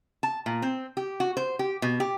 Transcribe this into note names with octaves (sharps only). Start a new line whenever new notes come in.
A5
A#2
C4
G4
F#4
C5
G4
B2
G4